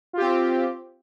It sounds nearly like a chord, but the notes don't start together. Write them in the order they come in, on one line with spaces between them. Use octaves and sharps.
F4 G4 C4